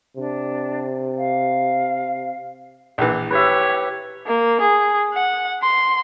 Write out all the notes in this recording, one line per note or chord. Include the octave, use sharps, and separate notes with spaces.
C3 D4
F5
A#1 E3
G4 B4 C#5 E5
A#3
G#4
F#5
C6